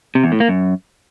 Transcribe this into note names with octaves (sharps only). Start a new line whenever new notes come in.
C3
E2
A2
A#3
F#2